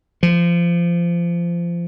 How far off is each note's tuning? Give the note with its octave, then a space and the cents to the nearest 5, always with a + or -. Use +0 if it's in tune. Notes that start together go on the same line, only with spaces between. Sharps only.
F3 -25